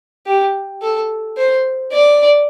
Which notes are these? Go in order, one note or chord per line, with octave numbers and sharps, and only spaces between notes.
G4
A4
C5
D5